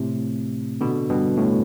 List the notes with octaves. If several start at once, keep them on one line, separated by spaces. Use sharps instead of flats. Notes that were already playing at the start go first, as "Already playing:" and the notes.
Already playing: A2 C3
B2 D3
G2 B2
A2